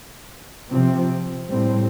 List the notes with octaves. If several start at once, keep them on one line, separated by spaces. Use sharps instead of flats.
C3 F3 C4
A2 G3 C4